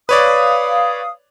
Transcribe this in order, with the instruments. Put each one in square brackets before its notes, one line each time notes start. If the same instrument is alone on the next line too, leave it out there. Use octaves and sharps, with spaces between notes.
[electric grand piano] B4 C#5 D5 [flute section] F5 D#6